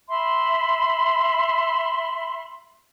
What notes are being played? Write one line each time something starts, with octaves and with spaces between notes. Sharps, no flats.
E5 B5 C6